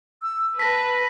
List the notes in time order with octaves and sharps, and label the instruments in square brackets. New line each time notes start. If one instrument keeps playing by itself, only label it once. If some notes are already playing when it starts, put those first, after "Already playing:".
[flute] E6
[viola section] B4 [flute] A5 [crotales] A#6 B6